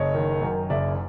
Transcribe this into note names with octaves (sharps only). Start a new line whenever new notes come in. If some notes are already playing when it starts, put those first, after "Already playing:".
Already playing: F#1 C#5 D#5
D#3
F#2
F#1 D5 E5